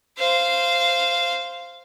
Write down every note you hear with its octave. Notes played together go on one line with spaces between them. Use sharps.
C5 F5